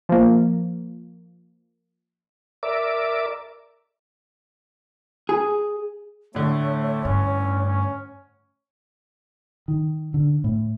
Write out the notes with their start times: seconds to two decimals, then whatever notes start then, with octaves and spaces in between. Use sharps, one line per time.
0.09 F3 A#3
2.63 A#4 D5 E5 D6
5.29 G#4
6.35 A2 D3 A3 C#5
7.05 G2 C#4
7.66 C#4
9.68 D#3
10.14 D3
10.44 A2